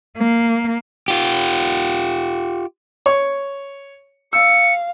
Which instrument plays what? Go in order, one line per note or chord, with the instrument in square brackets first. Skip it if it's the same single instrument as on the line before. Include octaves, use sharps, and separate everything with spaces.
[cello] A#3
[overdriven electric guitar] F4 G4
[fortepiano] C#5
[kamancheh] F5 [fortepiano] E6 [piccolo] C#7